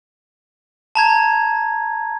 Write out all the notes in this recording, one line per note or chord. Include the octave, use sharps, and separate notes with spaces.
A5 A#5 G#6